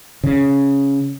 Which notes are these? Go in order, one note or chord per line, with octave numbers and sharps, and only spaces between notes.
C#3